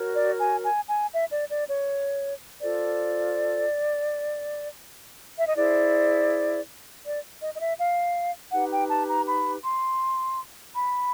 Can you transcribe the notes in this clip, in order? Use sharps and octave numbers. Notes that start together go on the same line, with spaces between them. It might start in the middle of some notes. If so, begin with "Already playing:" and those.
Already playing: F#4 A#4 C#5
D5
G#5
G#5
G#5
E5
D5
D5
C#5
F4 A4 C5 D5
E5
D#5
E4 G#4 C5 D5
D5
D#5
D#5
E5
F5
D#4 G4 B4 F#5
G5
A5
A#5
B5
C6
B5